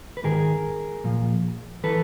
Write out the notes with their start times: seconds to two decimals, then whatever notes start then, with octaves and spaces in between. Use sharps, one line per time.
0.17 B4
0.23 G#2 D#3 G#4 A#4
1.04 A#2 F3
1.84 E3 A4 B4